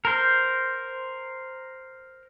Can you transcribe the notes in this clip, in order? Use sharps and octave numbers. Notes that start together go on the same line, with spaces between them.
A#4 C5